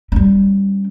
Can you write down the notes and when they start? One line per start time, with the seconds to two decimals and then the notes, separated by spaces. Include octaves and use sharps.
0.12 G3 C#4